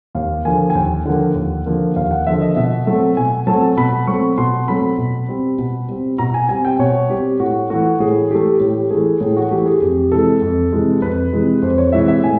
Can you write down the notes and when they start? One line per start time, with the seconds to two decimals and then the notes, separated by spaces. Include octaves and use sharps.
0.15 D#2 F5
0.45 D3 F3 A#3 G#5
0.70 G#5
0.75 D#2 G5
1.05 D3 F3 A#3 F#5
1.35 D#2
1.66 D3 F3 A#3
1.96 D#2 F5
2.11 F#5
2.26 D3 F3 A#3 E5
2.41 D#5
2.56 B2 E5
2.87 F#3 A3 C4
3.17 B2 G#5
3.47 F#3 A3 C4 A5
3.77 B2 B5
4.07 F#3 A3 C4 C#6
4.38 B2 C6
4.68 F#3 A3 C4 B5
4.98 B2
5.29 G3 C4
5.58 B2
5.89 G3 C4
6.18 B2 A#5
6.34 G#5
6.49 G3 C4 G#5
6.65 G5
6.79 B2 C#5
7.09 G3 C4 G4
7.40 A2 F#4
7.70 E3 A3 F#4
8.00 A2 G#4
8.30 E3 A3 G4
8.60 A2 G4
8.91 E3 A3 G#4
9.21 A2 G#4
9.36 F#4
9.51 E3 A3 G4
9.66 G#4
9.82 F2 G4
10.11 C3 E3 G#3 A4
10.42 F2
10.72 C3 E3 G#3
11.02 F2 B4
11.32 C3 E3 G#3
11.62 F2 C5
11.78 C#5
11.92 C3 E3 G#3 E5
12.08 E5
12.23 A2 G#5